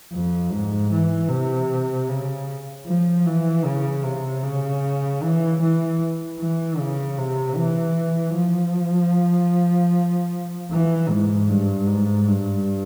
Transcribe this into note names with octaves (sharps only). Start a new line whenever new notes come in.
F2
G#2
E3
C3
C#3
F3
E3
C#3
C3
C#3
E3
E3
E3
C#3
C3
E3
F3
E3
G#2
G2
G#2
G2